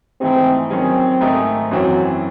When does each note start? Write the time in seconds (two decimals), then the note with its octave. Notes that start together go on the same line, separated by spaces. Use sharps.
0.21 G#2 E3 A3 C4 D#4 G#4
0.70 D#3 F#3 C4 C#4 G#4
1.21 G#2 D#3 A3 D#4 G#4
1.71 F#2 E3 F#3 C4